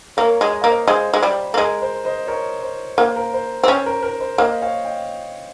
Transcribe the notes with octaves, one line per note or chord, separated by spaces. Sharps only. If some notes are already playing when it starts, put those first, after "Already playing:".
A#3 A#4 C#5
G#3
D#5
A#3 F5
C5 D#5
G#3 C5
G#3
G3
A#3
G#3 A#4
C5
C5 D#5
A#4 C#5
C5
A#3 C5
A#4
C5
C4
C#4 C5
A#4
A#4
C5
A#3 C5 D#5
C#5 F5
D#5 G5